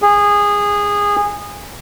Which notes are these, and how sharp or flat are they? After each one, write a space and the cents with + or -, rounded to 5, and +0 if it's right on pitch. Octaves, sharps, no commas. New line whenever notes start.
G#4 -20